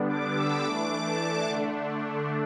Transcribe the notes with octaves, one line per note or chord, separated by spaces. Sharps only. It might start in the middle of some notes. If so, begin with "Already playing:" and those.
Already playing: D3 G3 B3 D4
D6
E6
E3 A3 D4 D6
A5
D3 A3 D4